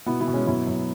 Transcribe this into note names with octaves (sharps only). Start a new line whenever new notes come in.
B2 B3 E4
B3 E4
B2
G#3 C#4
F#2 B3 E4
F#2